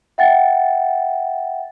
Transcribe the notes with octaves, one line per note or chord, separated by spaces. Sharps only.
E5 F#5 G5 A6